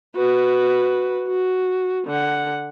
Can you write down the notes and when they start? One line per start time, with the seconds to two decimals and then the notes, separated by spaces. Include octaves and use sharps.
0.16 F#4 B4
1.28 F#4
2.07 D3 F#5